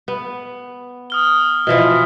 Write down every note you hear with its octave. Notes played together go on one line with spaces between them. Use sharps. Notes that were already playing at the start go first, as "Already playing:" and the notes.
B3
D#6 F6 G7
B2 E3 F3